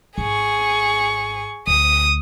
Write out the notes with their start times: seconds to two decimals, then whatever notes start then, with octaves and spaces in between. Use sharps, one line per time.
0.18 G#1 G#4 C#6
1.67 D2 D#6